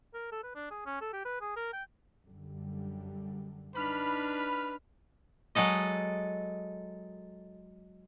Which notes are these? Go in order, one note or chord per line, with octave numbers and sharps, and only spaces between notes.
A#4
A4
B4
D4
G#4
C#4
A4
G4
B4
G#4
A#4
G5
F#2 D3 G3
D4 D#4 B4 B5 F6
F#3 G#3 A4 D#5